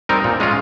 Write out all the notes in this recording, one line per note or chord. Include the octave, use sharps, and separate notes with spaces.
G3 C4 D#4 A#4
A#2
G#3 C#4 F4